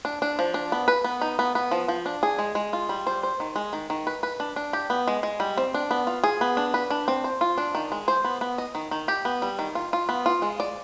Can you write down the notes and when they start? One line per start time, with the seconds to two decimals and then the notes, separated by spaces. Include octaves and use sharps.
0.05 D4
0.22 D4
0.39 F3
0.54 D4
0.72 B3
0.88 B4
1.04 B3
1.22 D#4
1.39 B3
1.55 B3
1.71 F3
1.88 F3
2.06 D4
2.23 G#4
2.39 G#3
2.55 G#3
2.73 F4
2.89 G3
3.07 C5
3.23 C5
3.40 D#3
3.56 G#3
3.73 D#3
3.90 D#3
4.07 B4
4.23 B4
4.40 D4
4.56 D4
4.73 G4
4.90 B3
5.08 G#3
5.23 G#3
5.40 G3
5.57 C4
5.74 D4
5.91 B3
6.07 F4
6.24 G#4
6.41 B3
6.57 D4
6.74 B4
6.90 D4
7.08 C4
7.24 C5
7.41 F4
7.58 D4
7.75 D#3
7.92 G#3
8.08 C5
8.24 B3
8.41 B3
8.58 D#5
8.75 D#3
8.91 D#3
9.08 G4
9.25 B3
9.42 G3
9.59 D#3
9.75 F4
9.93 F4
10.09 B3
10.26 F4
10.42 G#3
10.60 D5